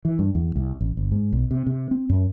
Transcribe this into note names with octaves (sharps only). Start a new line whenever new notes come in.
E3
G2
E2
C2
A1
G1
G#2
B1
C3
C3
C4
F#2